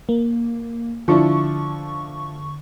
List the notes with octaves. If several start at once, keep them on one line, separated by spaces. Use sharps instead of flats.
A#3
D3 F3 D4 E4 C#6